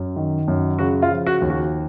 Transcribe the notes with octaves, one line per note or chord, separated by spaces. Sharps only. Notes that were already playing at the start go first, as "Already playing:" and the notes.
Already playing: F#2
D#3
F#2
C#3 F#4
F4
F3
F#4
D#2
F#4